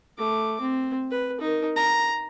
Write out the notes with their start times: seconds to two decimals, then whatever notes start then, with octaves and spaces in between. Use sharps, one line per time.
0.18 A3 D6
0.60 C4
1.11 B4
1.41 D#4 A#4
1.76 A#5